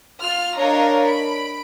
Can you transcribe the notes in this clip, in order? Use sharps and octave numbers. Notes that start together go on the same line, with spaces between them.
F4 F6
D4 A#4 C#5 D#5 F5 A#5
B5 D7